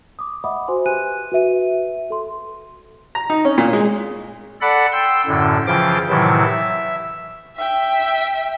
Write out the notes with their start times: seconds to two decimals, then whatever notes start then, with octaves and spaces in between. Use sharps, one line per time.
0.19 D6 D#6
0.44 D#5 E5 F#5 B5 D6 D#6
0.68 F#4 C5 G#5 C6
0.86 G4 B4 G#5 F#6 D#7
1.32 F#4 B4 E5 D#7
2.10 A4 C6
3.15 A#5
3.30 D#4
3.45 C#4
3.58 A#2
3.73 G#3
4.61 A4 D5 F#5 B5
4.92 G5 C6 E6
5.27 F#2 A2 D3
5.67 C#3 E3 F3 F4 G5 D6
6.09 A2 C3 D#3 E3 F#3 E4
6.44 E5
7.57 E5 G5